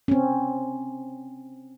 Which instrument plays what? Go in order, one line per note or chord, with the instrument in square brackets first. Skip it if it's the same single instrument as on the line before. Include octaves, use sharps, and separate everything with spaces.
[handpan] C4 C#4